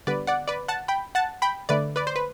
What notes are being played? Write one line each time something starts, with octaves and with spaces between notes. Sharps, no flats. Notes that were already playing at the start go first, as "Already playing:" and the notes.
D3 G3 B3 B4 D5
D5 F#5
B4 D5
F#5 A5
G5 B5
F#5 A5
G5 B5
D3 A3 B4 D5
B4 D5
C5
B4